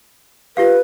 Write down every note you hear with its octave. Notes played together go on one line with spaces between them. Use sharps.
F4 G4 B4 F5